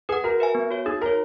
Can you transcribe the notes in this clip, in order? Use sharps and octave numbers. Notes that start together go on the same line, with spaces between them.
G#4 B4 F#5
F#4 A#4
B4 E5 G#5
B3
F#4 C#5
D#4 G#4
F#4 A#4 C#5